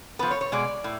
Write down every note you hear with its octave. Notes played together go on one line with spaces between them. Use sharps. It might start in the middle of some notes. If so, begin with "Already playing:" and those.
F3 B3 B4
C#5
C#5
B2 G#3 D5
A2